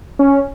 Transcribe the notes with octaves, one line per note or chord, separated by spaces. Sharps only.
C#4